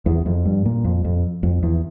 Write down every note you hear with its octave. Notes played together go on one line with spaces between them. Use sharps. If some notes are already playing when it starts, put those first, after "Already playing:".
E2
F2
G2
A#2
F2
F2
F2
E2